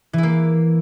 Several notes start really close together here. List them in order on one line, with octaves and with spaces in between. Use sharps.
E3 E4 A#3